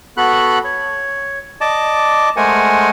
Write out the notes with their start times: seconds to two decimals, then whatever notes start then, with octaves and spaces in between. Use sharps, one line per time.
0.17 B3 F#4 A4 B5 F#6
0.64 C#5
1.61 D5 D#5 A5 D6
2.37 G#3 A3 A#4 C5 F#5 G#5